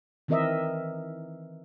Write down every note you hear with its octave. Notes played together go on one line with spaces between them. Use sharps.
D#3 E3 C4 A#4 D#5 E5